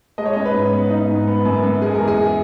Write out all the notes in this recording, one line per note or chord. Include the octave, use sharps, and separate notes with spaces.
G#3 D#5
C#5
C#4 D#5
B4
G#2
B3
D#4
G#2
B3
F#2
F#2
G#3 G#4
A#4
E2
G#4